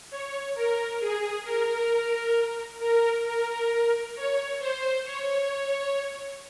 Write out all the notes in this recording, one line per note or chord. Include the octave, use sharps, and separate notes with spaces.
C#5
A#4
G#4
A#4
A#4
A#4
C#5
C5
C#5